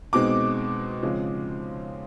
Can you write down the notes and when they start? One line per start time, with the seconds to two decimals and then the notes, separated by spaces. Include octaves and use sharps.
0.13 B2 G#3 C4 D#4 D6
1.03 C#3 F3 G#3 C4